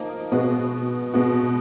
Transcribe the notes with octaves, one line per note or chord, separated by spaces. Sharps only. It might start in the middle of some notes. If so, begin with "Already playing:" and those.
Already playing: F3 A#3 D#4
B2 G#3 B3 F#4
B2 G#3 B3 F#4